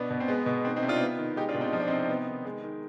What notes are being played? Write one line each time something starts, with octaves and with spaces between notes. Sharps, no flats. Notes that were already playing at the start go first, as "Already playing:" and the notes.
Already playing: B2 B3 D4
B2
C4
G#3 B3
B2
D#3 C4
C4 D#4
C3
D4 F4
B3
D#3
G#3 D#4 G4
D4 F4
B2
C4 D#4
F3 D#4
D4
C3 C4 D#4
B3
D#3
G#3
D#3